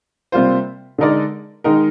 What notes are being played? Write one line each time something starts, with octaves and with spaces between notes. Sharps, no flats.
C3 G3 A#3 F4 C5
D3 G#3 D#4 A#4 D5
D#3 G#3 D#4 A#4